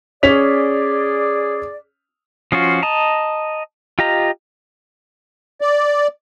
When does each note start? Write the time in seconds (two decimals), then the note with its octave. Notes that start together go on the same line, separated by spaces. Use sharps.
0.23 C#4 G#4 D5 B6 F7
2.52 F3 C#4 F4 F#4
2.82 D#5 A5 A#5
3.99 F4 G4 D#5 A#5
5.61 D5